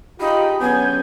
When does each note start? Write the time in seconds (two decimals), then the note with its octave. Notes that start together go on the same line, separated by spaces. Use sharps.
0.20 D#4 F4 G4 G#4 B5
0.61 D3 F#3 B3 C#4 G#5 G6